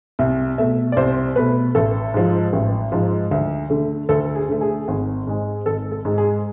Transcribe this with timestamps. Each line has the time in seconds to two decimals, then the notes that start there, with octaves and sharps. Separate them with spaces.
0.19 C2 E5
0.58 B2 A3 E5
0.92 D5
0.97 C2 C5
1.36 B2 A3 B4
1.75 A1 A4
2.14 G#2 F3
2.53 A1
2.92 G#2 F3
3.31 D2
3.70 D3 A3
4.09 D2 A4
4.35 G#4
4.49 D3 A3
4.61 G#4
4.88 G#1
5.27 G#2 G#3
5.66 G#1 A4
5.92 A4
6.05 G#2 G#3
6.18 G#4